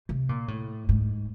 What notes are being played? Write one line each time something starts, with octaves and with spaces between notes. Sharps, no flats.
C3
A#2
A2
G#2